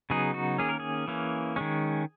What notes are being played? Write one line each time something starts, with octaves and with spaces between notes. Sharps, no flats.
C#3 F#3 B3 D#4 G#4
F#4
D#3 A#3 C#4 G#4
A#4
G#4
E3 A#3 C#4
D#3 G#3 C#4